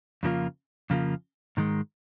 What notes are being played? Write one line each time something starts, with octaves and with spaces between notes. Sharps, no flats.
F2 C#3 F3 A#3 F4
F2 C#3 F3 A#3 F4
G#2 D#3 G#3